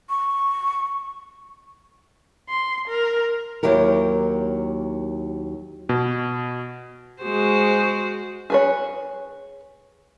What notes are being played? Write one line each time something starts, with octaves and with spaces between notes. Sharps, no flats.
C#6
C6
A#4
D#2 F#3 E4 G4 A#4
B2
G#3 F#4 C5
G#4 B4 C#5